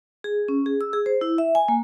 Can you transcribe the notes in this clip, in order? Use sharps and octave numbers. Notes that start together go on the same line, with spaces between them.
G#4
C#4
G#4
E6
G#4
C5
E4
E5
G#5
A#3